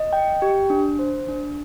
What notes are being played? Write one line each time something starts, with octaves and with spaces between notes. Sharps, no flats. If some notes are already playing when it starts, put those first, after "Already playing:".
Already playing: D#5
G5
G4
D4
C5
D4